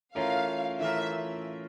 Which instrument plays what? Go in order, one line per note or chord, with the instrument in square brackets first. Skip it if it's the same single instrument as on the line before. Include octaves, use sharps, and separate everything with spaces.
[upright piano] E3 A3 C#4 F4 A#4 [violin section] F5
[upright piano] E3 A3 C#4 F4 A#4 [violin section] E5